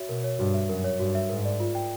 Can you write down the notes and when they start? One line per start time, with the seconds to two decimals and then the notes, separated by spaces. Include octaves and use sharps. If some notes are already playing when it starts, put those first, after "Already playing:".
Already playing: F#4 C#5 E5
0.09 B2 A#4
0.24 C#5
0.39 G2 F#4
0.54 E5
0.69 F#2 A#4
0.84 C#5
0.99 G2 F#4
1.15 E5
1.29 G#2 A#4
1.45 D5
1.60 F4
1.75 G5